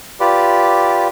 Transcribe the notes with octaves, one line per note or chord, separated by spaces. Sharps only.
F4 G4 B4 D5